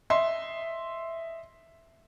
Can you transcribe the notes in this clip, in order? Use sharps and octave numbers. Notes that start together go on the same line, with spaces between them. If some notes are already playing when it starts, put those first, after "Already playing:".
D#5 E5 C6